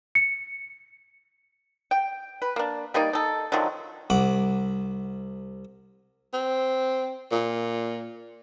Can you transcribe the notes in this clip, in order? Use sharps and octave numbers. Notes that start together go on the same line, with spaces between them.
C#7
G5
B4
A#3 D4
G3 A#3 D#4 D5
D#4 A4
D3 D#3 F3 F#3
C2 F#5 D6
C4
A#2